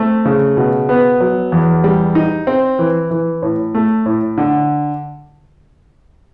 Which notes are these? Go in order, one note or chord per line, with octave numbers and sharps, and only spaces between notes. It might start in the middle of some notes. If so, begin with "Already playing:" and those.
Already playing: A3 C4
C#3
B2
B3
F#3
E2
G3
D#4
C4
E3
E3
A2
A3
A2
D3